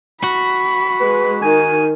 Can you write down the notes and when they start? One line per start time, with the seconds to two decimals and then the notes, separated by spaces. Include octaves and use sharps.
0.24 F#4 B5
1.00 G#3 B4
1.42 D#3 G#5